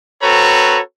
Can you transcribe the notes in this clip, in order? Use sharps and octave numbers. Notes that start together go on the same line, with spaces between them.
C4 F#4 A4 B4 C#5 A#5